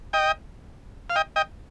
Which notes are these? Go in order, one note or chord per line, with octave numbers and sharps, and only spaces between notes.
D#5 G5
F5
D#5 G5
D#5 G5